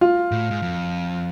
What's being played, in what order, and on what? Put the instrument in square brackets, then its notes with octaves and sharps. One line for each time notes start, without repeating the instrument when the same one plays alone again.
[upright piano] F4
[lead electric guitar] A2
G#2
F2